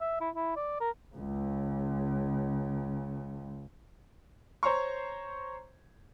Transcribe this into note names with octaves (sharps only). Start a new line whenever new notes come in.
E5
E4
E4
D5
A#4
C#2 C#3
C5 C#5 A#5 C6 C#6